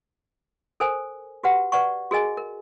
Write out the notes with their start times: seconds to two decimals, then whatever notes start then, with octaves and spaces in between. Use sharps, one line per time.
0.80 A4 A#4 C5 G#5
1.44 F#4 G4 B4 F#5
1.72 B4 D5 F#5 C#6
2.11 F#4 G#4 A#4 D#5 G#5
2.37 A#4